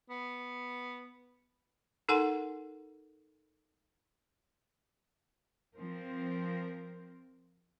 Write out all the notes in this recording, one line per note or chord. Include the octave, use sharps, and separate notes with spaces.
B3
D#4 A4 A#4 F#5 G#5 C6
F3 C4 A#4 C5